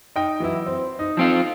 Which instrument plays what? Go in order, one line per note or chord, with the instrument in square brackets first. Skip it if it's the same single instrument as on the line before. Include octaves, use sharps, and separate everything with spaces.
[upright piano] D#4 G5
E3 F#3 E4
C4
D#4
[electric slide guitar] F3 C4 F4